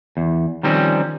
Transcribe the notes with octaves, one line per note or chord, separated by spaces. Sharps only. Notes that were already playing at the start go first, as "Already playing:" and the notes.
E2
D#3 F3 G3 C4 C#4